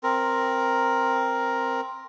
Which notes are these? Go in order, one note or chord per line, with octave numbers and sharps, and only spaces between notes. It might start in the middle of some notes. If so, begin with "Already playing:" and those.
C4 A#4